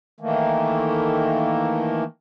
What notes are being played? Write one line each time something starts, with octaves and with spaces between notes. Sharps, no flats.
D#3 E3 A3 A#3